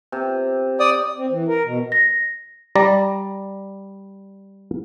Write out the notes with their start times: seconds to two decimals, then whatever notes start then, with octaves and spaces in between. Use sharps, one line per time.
0.12 C3
0.80 D5 D#6
1.17 C4
1.31 E3
1.48 A#4
1.65 B2
1.92 A#6
2.75 G3 D5 A#5